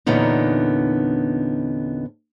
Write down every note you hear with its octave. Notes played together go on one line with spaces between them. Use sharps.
E2 A#2 D3 B3 C#4 D#4